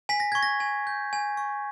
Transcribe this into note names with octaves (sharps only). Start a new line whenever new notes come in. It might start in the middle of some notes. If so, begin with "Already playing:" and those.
G#5 B6
A#6
C#6 G#6
A#6
G#5
G6
G#5
C#6